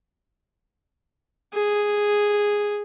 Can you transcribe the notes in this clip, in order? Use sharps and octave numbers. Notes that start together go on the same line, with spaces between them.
G#4